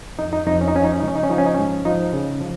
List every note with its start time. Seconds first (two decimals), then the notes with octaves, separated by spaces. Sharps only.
0.19 F2 D#4
0.33 D#4
0.47 F2 D#4
0.61 C#4
0.68 D#4
0.75 F3 C#4
0.84 D#4
0.92 C#4
1.00 C#2 D#4
1.08 C#4
1.16 D#4
1.23 C#4
1.30 F3 D#4
1.38 C#4
1.46 D#4
1.54 G#2 C#4
1.85 F3 D#4
2.13 C#3
2.41 F3